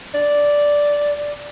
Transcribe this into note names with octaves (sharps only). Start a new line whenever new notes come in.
D5